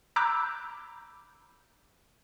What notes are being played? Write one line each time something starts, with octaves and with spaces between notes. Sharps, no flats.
A#5 B5 D6 E6 F#6 G6